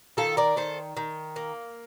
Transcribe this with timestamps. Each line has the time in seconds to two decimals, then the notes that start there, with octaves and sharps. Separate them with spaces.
0.17 D#3 F4 A4
0.37 A#4 D5
0.56 D#3 A4 C5
0.97 D#3
1.36 A#3